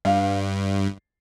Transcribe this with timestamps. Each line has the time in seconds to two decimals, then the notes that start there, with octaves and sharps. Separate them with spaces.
0.05 G2 F5